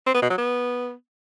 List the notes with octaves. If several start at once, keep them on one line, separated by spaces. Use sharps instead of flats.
C4
B3
B2
F#3
B3